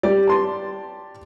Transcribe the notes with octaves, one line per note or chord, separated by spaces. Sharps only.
G3 G4 D5
A5 C6